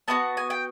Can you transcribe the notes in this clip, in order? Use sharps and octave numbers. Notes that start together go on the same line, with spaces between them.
B3 D#4 F#4 A5
G#5
G5